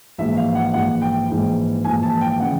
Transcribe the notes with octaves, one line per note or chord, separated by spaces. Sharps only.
A#1 G#2 E3 E5
F5
F#5
A#1 G#2 E3 F#5
G5
A#1 G#2 E3
A#1 G#2 E3 G#5
A5
G5
C#3 E3 F#5